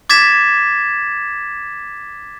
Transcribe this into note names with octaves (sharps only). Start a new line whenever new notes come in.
D6 G#6 A6 B6 E7